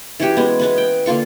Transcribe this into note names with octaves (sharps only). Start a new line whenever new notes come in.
E3 C#4 F#4 G4
G#3 B3
G#3 B3 B4
G5
D3 A#3 F4 C#6